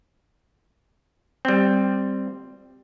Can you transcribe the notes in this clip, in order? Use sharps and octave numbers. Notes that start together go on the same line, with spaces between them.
G3 C4